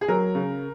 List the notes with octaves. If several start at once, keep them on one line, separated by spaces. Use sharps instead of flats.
G#4
F#3 A#4
C#3